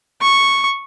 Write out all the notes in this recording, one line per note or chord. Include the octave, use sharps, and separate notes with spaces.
C#6